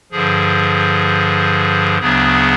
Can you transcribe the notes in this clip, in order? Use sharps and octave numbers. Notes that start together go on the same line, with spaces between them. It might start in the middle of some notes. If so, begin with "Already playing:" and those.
G2 D3 F3 G#4
D2 C#3 F#3 B3 D4 G#4